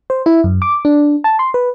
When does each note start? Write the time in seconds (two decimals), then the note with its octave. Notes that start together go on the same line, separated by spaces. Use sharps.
0.10 C5
0.26 E4
0.44 F#2
0.62 D6
0.85 D4
1.24 A5
1.39 C6
1.54 B4